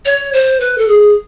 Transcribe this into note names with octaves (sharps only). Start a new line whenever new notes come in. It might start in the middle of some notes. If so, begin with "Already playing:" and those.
C#5
C5
B4
A4
G#4